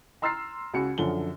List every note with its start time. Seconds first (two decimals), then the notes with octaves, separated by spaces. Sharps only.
0.22 A#5 C6 E6 F6 A6 C7
0.73 C#2 F#4 C#7
0.98 F#2 D3 F3 G7